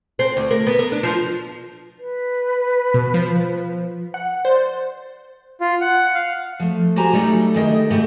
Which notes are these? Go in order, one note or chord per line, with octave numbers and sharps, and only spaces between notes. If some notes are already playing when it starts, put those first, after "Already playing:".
C4
D2
A#4
B3
A#4
D4
F3
B4
B2
F3
F#5
C5 D5
F4
F#5
F5
F3 A3
F#4 G4 C5 G#5 A#5
F#3 G3 A3 D#4
D#3 A3 E4 G#4 D#5 G5
G#2 C3 A3 F#4 G4 E5